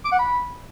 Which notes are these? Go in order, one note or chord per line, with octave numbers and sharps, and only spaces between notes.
D6
F#5
B5